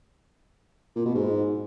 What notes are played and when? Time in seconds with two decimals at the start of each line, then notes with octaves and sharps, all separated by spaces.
0.96 A#2
1.05 B2
1.15 G#2